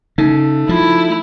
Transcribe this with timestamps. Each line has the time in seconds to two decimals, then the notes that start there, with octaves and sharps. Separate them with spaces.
0.18 C#3 A3 D#4
0.69 F3 E4